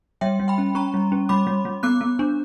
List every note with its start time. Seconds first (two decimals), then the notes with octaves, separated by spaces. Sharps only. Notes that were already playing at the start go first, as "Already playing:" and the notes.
0.21 G3 E5 G5
0.40 G3
0.48 G5 B5
0.58 C#4
0.75 C#4 A#5 C#6
0.94 G3
1.12 C#4
1.29 G3 B5 D6
1.47 G3
1.65 G3
1.83 B3 D6 F#6
2.01 B3
2.19 D4